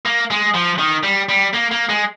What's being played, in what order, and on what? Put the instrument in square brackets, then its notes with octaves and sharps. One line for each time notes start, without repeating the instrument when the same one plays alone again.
[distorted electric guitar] A#3
G#3
F3
D#3
G3
G3
A#3
A#3
G#3